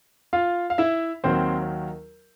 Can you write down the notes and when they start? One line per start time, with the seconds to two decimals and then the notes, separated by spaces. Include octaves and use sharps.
0.33 F4 F5
0.70 F5
0.78 E4 E5
1.24 D#2 D#3 F#3 C4 C5